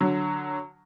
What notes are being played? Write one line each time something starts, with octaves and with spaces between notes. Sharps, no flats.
D3 F#3